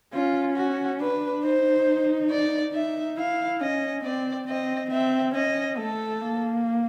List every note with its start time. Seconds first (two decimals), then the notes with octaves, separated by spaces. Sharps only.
0.13 C#4 F4
0.57 F#4
1.00 D4 B4
1.44 D#4 C5
2.31 D5
2.74 D#4 E5
3.17 E4 F5
3.61 C#4 D#5
4.04 C4 D5
4.48 C4 D#5
4.91 C4 E5
5.35 C#4 D#5
5.78 A3 A4
6.21 A#3